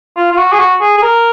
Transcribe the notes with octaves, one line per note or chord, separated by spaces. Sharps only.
F4
F4
F#4
G#4
F#4
G#4
G#4
A#4